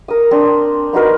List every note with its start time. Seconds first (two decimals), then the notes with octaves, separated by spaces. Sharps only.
0.08 A#4 D#6
0.31 C4 D4
0.93 B3 D#4 F#4 A#4